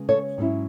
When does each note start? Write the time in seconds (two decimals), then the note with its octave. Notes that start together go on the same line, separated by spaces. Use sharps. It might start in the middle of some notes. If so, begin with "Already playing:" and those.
Already playing: C#3 G#3 B3
0.09 A4 C#5
0.38 G#2 F#3 C#4 E4